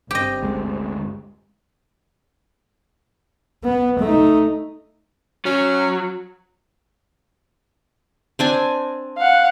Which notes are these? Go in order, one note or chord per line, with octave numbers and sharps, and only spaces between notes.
G1 C4 G4 D#5
D2 G#3
B3
A3 D#4
F#3 C#4
C4 D4 G#5
F5 F#5